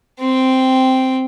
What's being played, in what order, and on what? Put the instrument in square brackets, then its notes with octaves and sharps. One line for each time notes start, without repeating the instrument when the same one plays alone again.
[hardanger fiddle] C4 G5